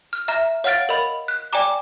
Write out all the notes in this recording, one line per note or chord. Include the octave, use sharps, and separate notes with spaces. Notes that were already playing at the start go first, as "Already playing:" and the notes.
F6
E5 A#5 F6
C#5 F5 F#5 F6 A6 D7
A#4 D#5 B5
F#6
D5 G5 G#5 A#5 D6